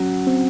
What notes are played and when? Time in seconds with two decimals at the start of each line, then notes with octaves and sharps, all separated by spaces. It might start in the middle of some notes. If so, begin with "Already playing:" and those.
Already playing: F#3 C#4
0.27 C4